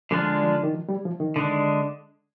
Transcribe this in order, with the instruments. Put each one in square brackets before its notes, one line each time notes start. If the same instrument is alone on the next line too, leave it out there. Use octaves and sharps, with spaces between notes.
[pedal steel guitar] D3 G#3 D4 F4 [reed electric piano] F3
[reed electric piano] F3
D#3
F3
G3
F3
D#3
[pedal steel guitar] D3 G#3 D4